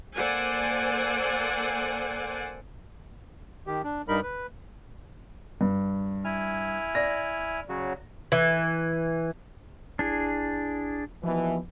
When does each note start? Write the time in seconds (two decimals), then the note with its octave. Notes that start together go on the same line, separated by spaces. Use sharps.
0.15 A#3 A4 C5 D5 F#5 G#5
3.67 D#3 G4
3.84 D4
4.08 G2 G3 D#4 A#4 B5
4.23 B4
5.61 G2
6.25 E4 G#5 F6
6.95 D5 A#6
7.69 C#3 F#3 F#4
8.32 E3
9.99 A1 D4 E4 G#4 G#6
11.24 D#2 B2 E3 F3 B3